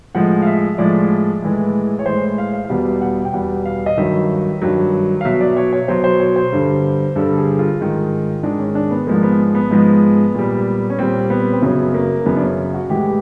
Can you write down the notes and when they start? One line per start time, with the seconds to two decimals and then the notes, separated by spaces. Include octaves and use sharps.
0.15 A2 F3 G#3 F#5
0.42 F5
0.47 E5
0.78 A2 F3 G#3 D5
1.42 A2 E3 G#3
1.99 C#5
2.06 A2 E3 G#3 C5
2.38 F5
2.53 F5
2.65 F5
2.69 E2 B2 G3 F#5
3.01 F#5
3.25 G5
3.33 E2 B2 G3 F#5
3.65 F5
3.86 D#5
3.97 G2 D#3 F#3 E5
4.62 G2 D#3 F#3
5.21 F5
5.25 B2 F#3 E5
5.41 D5
5.57 C#5
5.73 C#5
5.88 B2 F#3 C5
6.04 C5
6.20 C#5
6.36 C5
6.52 G2 D3 G3
7.16 G2 D3 G3 A4
7.38 G#4
7.59 F4
7.80 G#2 D#3 G#3
8.43 G#2 D#3 G#3 D4
8.59 C#4
8.75 D4
8.91 B3
9.07 G#2 F3 G#3 A#3
9.23 B3
9.55 B3
9.70 G#2 F3 G#3
10.35 A#2 G3
10.90 C#4
10.98 A#2 G3 C4
11.30 B3
11.52 C4
11.62 F#2 C#3 F#3 B3
11.94 A#3
12.26 F#2 C#3 F#3 B3
12.36 D4
12.42 C#4
12.74 F#4
12.89 A2 E3 G#3 G4